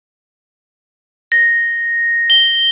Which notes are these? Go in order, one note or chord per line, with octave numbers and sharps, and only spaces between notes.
A#6
G7